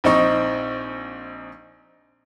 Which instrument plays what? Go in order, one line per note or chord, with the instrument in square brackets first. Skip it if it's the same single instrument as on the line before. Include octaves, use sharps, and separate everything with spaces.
[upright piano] A#1 C4 D#4 C#6